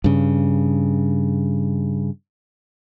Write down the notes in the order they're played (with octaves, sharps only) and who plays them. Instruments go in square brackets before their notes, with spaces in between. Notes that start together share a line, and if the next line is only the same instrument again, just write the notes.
[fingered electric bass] G2 C#3